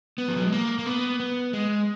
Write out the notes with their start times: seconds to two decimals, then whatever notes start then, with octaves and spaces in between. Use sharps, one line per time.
0.18 B3
0.28 F3
0.37 F#3
0.44 G#3
0.52 A#3
0.79 A#3
0.86 B3
1.20 B3
1.53 G#3